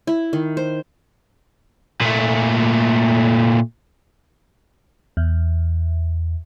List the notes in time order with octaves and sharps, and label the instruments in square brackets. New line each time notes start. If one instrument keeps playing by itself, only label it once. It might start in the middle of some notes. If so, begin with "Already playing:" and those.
[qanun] E4
D#3
C5
[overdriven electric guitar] A#2 A3
[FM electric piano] E2